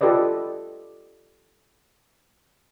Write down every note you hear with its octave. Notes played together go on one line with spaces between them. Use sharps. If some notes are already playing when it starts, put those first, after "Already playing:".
F4 G4 A4 B4 D5 D#5